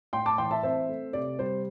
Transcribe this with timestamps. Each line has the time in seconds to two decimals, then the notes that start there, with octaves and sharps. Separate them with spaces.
0.13 A2 G5 C6
0.26 A5 D6
0.38 E3 G5 C6
0.51 E5 A5
0.63 C4 C5 E5
0.89 A3
1.13 C3 D5
1.39 G3 C5